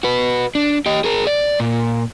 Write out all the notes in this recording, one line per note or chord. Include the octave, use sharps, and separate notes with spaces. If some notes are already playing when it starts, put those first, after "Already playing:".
F#4 B4
D4
G4 D#5
G#4 A#4
D5
A#2